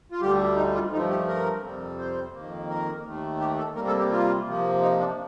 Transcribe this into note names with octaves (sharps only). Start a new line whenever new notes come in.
F4
D2 D3 G3 G4
D#4
F4
G2 F3 A3 D#4
G4
A#4
F2 C3 G3 C4
C5
F2 D#3 A#3
A#4
D#2 D#3 A3
G4
A4
C3 G3 A#3 A#4
A4
G4
F4
C3 F3 A#3
D#4
D4